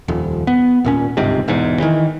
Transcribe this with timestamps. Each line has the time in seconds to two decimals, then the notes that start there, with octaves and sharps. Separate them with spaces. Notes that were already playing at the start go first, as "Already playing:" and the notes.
0.08 D#1 F2
0.47 B3
0.85 D#1 A#2 C#4
1.17 G1 C#2 G#2 C3
1.48 E1 E2 G#2
1.80 D#3 E3